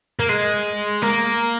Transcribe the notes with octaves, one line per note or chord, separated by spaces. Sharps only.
A#3
G#3
A#3